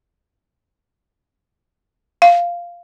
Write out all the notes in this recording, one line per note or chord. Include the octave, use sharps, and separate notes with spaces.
F5